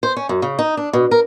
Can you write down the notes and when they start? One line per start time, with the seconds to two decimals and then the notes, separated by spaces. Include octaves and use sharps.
0.03 C5
0.16 C#4
0.29 F#2
0.42 C#3
0.59 D#4
0.77 D4
0.93 B2
1.11 A#4